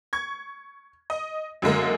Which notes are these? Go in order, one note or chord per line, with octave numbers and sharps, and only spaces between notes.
C#6 G#6
D#5
F#2 D3 G#3 A#3